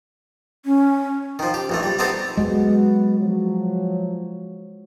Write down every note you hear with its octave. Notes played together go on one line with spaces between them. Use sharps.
C#4
D#3 F3
G4
A#1 E3 A3
G3
B3 C4 D#4 G4 A4
F#3 G#3 B3 F#4
F3 F#3